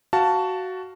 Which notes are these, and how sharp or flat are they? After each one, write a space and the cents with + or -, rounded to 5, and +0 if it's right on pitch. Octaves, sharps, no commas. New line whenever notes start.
F#4 +10 F5 +0 A5 +0